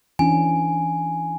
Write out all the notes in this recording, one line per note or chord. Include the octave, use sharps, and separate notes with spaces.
E3 C#4 D4 G#5